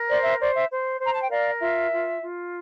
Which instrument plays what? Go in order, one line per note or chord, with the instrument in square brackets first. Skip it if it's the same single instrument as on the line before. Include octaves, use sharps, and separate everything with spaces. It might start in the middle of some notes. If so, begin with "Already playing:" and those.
Already playing: [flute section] A#4
C5 D5
E5
C5 D5
E5
C5
C5 A#5
A5
G5
A#4 D5 F5
F4 E5
F4
F4